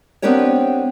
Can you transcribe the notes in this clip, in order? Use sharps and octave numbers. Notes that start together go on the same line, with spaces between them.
B3 C4 D4 G4 A#4 C#5